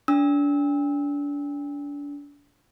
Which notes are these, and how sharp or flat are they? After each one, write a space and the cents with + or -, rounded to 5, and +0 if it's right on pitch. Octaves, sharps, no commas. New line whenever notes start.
D4 -35 E6 -25